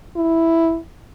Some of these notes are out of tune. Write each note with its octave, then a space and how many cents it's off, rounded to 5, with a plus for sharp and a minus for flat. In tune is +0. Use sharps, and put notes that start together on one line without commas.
E4 +0